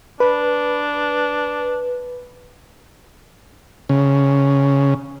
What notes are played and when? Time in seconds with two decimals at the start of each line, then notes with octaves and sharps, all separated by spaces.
0.20 D4 B4
3.89 C#3